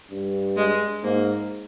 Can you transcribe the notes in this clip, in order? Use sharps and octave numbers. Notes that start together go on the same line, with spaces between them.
G2
G#3
G#2 A#3